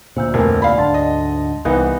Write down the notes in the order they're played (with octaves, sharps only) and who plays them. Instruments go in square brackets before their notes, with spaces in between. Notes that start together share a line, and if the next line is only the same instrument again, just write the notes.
[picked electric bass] D2 A#2 [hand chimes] C5 E6 G6
[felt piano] F1 A#3 [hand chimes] G#5
[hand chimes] D5 [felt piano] F5 B5
[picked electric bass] D2 G#2 D3 [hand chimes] A5 C6 A6
[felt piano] D#5
[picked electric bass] C2 [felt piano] E3 B3 D#4